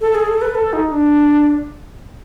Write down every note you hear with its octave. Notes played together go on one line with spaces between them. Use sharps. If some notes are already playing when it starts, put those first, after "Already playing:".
A4
G#4
A4
B4
A4
D#4
D4